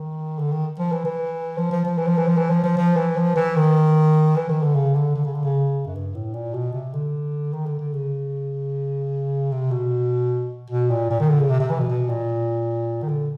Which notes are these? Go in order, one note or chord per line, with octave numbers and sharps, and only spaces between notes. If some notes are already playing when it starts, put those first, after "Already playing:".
Already playing: D#3
D3
D#3
F3
E3
E3
F3
F3
F3
E3
F3
E3
F3
E3
F3
F3
F3
E3
F3
E3
D#3
E3
D#3
D3
C#3
D3
D3
C#3
D3
C#3
F#2
G2
A2
A#2
B2
C3
D3
D#3
D3
D3
C#3
C3
B2
B2
A#2
A#2
D#3
D3
C#3
C3
C3
E3
B2
B2
A#2
D#3
D3